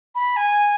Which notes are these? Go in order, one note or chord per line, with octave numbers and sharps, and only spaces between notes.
B5
G#5